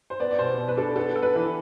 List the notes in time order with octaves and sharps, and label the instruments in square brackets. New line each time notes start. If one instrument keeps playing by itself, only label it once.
[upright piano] C5
[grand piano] B3 [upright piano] D5
[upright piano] D5
[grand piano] B2 [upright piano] C5
[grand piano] B2
[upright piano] B4
[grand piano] D4 [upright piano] A4
[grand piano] B3 [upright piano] A4
[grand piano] A4
[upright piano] B4
[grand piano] E3